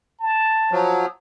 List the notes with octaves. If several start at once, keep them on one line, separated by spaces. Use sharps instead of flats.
A5
F3 F#3